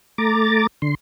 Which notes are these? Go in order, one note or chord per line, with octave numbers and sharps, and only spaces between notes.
A3 A#5 D6 A6
D3 C6